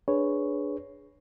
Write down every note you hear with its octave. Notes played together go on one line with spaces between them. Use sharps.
D4 G#4 B4 C#5